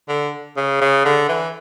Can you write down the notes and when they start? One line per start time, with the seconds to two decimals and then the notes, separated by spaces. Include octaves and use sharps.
0.09 D3
0.57 C#3
0.81 C#3
1.05 D3
1.29 E3